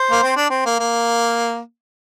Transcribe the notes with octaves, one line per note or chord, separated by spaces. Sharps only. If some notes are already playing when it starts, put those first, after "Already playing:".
Already playing: C5
A#3
C4
D4
C4
A#3
A#3